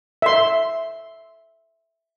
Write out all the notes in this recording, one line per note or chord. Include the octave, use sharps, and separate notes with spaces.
E5 C6